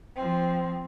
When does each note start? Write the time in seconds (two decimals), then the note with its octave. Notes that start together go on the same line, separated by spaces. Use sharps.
0.16 F3 C4